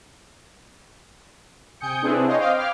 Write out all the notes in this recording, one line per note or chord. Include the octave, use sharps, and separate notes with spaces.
C3 G5 G#5 D#6 G6 C#7
C3 C4 D4 E4 G#4 B4
C5 C#5 D#5 F5 G5
C5 D#5 F5 G5 D6 F6
F5 G5 B5 D6 F6 G#6